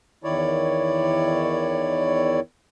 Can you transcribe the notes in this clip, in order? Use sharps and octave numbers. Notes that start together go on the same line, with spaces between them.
E2 D#3 E4 C#5 D5